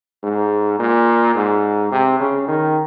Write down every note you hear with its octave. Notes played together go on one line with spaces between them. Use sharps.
G#2
A#2
G#2
C3
C#3
D#3